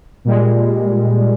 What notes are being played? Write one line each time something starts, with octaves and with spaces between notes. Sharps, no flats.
A#2 G3 G#3